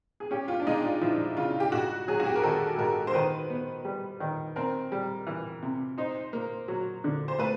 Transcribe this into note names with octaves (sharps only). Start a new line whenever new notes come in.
G#4
C#4 G4
F4
D4
G#3 D#4
F4
F3 E4
C#3 F4
G4
G#2 F#4
F#3 G#4
F#4
G4
A#4
D#3 A4
G#2 A#4
C5
D#3 B4
B3
G3
D#3
C4 A#4
G3
E3
C3
D#4 C5
A#3
F#3
D3
C5
A3 B4